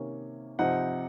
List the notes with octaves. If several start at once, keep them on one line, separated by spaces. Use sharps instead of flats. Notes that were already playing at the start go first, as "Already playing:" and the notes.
Already playing: C3 D#3 A#3 C#4
C3 F3 C4 D#4 F#5